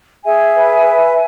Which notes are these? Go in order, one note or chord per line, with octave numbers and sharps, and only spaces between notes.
G#4 E5 G#5
B4
B4